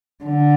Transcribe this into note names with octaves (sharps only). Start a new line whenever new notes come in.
D3